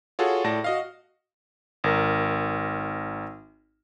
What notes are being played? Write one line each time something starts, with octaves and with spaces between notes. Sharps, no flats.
F4 F#4 G#4 A4 C#5 F#5
A2 D5 A5 A#6
F#4 D#5 F5
G#1 A#4